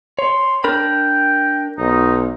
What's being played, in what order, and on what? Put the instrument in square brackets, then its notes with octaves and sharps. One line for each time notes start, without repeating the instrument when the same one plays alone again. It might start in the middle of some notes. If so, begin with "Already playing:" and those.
[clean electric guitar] C#5 [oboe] C6
[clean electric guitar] D4 A#4 B5 [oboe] G5
[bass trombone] B1 [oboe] D#4